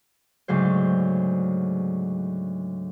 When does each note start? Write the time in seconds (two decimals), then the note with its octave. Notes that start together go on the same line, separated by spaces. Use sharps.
0.48 D2 G#2 C#3 F#3 C5